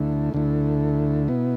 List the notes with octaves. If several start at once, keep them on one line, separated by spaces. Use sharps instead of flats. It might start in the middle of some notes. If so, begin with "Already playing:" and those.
Already playing: D2 D3 A3 E4
D2 D3 A3 E4
B2 B3 E4